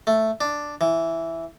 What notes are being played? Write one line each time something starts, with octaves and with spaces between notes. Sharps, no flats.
A3
D4
E3